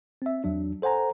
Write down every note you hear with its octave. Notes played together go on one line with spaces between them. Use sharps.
C4 E5
E2 F#3 D4
A4 C5 F#5 G#5 A#5